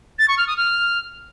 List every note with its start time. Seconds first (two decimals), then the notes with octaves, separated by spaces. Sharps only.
0.18 A6
0.28 C#6
0.37 F6
0.47 D#6
0.57 F6